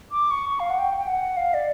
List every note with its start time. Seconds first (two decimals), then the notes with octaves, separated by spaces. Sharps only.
0.12 D6
0.31 C#6
0.49 C#6
0.60 F5
0.70 F#5
0.79 G5
0.98 G5
1.07 F#5
1.37 F5
1.54 D5